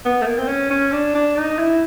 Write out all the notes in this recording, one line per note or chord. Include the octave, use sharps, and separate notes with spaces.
B3
A3
A#3
C4
C#4
C#4
D4
D4
D#4
E4